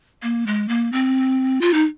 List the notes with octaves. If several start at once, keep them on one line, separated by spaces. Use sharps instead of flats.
A#3
G#3
A#3
C4
F4
D#4